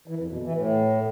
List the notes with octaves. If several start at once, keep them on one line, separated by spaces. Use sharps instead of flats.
E3
F2
B2
E3
A2